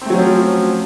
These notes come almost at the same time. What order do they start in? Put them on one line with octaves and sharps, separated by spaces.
C4 A3 F#3 C#4 F3